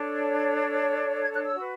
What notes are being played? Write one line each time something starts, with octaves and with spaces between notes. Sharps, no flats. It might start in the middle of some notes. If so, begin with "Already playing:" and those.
Already playing: D4 A4 C#5
G#6
F#6
E6
F#4 B4